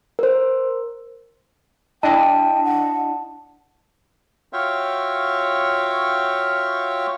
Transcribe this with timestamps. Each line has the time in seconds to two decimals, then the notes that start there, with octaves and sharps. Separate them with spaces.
0.19 A#4 C5
2.03 D4 E4 D#5 G5 A5
2.64 F#5
4.53 F4 F#4 C#5 E5 F5 G5